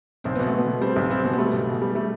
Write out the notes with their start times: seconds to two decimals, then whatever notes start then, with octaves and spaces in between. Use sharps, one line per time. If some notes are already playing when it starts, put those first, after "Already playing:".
0.24 B1 C4
0.36 B2 B3
0.47 A3
0.53 B2 B3
0.67 B2
0.81 G3 C4
0.96 B1
1.10 G3 C4
1.24 B2
1.33 B3
1.38 G3 A3
1.53 B1
1.67 B2
1.82 G3
1.95 G3 A3